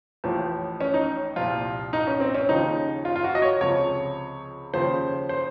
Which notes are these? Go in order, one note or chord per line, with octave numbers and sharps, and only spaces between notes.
A1 A2 F3
C#4
D#4
C2 A#2 F3 F4
D#4
C#4
C4
C#4
D#2 C#3 F3 D#4
F4
F4
F#4
D#5
C#5
C#2 C3 F3 C#5
D#2 C#3 F3 C5
C5